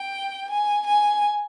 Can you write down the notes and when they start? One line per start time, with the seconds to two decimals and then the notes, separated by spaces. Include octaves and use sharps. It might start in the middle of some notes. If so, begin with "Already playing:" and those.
Already playing: G5
0.51 G#5
0.87 G#5